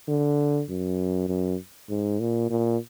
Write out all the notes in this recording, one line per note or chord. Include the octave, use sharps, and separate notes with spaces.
D3
F#2
F#2
G#2
A#2
A#2